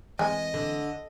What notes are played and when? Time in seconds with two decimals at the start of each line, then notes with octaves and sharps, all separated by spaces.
0.19 E3 G#3 A3 C4 D#5
0.54 D3